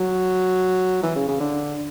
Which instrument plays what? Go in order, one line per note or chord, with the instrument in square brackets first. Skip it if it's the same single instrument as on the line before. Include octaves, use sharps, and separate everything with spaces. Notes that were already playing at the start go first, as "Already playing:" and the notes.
Already playing: [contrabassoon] F#3
E3
C#3
C#3
D3